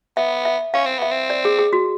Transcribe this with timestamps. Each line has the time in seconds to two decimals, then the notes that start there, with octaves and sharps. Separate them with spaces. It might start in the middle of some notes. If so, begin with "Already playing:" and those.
0.17 B3 E5
0.45 E5
0.74 C#4 F5
0.86 C4
0.98 B3 E5
1.11 C4
1.30 D5
1.45 G#4
1.59 G#4
1.73 F#4